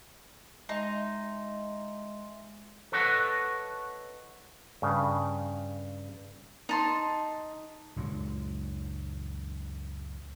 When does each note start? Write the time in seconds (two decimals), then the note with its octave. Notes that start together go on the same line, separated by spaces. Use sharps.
0.69 G#3 D#4 E5 C6
2.92 A4 B4 C#5 D#5 F#5
4.82 G2 C#3
6.69 D#4 A5 C6
7.96 C#2 F#2 A#2 G#3